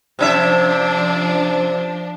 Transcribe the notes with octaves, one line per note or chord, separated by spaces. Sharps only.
C3 F3 C#4 D4 E5